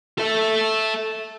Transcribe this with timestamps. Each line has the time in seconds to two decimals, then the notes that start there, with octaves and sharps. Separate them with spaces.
0.18 A4 E5